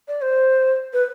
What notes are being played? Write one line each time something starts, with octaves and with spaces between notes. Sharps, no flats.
D5
C5
B4